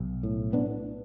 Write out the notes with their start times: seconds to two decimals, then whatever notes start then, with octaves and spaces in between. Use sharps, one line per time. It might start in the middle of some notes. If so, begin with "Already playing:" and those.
Already playing: B1
0.23 A2
0.53 B3 D4